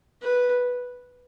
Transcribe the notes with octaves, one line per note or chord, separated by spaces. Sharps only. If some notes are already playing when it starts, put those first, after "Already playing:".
B4